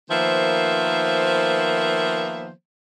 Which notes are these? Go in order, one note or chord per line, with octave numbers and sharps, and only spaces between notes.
D#3 F3 A#3 B3 C5 E5